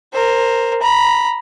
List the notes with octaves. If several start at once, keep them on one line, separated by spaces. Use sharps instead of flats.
A#4 C5
A#5 B5